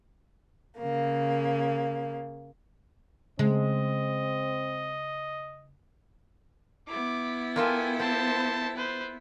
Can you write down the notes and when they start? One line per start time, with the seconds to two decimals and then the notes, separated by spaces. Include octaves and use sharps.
0.77 C#3 A#3
3.39 C#3 G#3 C4 D#5
6.88 B3 E4 D6
7.56 A#3 F4 A4 G5 G#5
8.00 C4 C5 A5
8.77 B4 C5